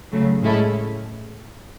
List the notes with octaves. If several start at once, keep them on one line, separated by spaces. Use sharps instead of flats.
C#3 F#3 A3
A2 G#3 C#4 E4 A4